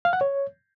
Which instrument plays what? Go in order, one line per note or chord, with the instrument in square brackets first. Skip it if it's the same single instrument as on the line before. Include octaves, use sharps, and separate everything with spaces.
[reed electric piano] F5
F#5
C#5